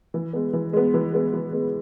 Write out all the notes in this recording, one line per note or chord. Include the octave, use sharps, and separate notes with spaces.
E3
G#3 B3
E3
G#3 B3
E3
G#3 B3
E3
G#3 B3